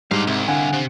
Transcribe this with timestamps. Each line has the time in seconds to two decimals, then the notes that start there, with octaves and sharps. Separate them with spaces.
0.11 G#2 G3 D4 F5
0.27 C2 C3
0.48 D3 F5 F#5 G#5
0.73 C3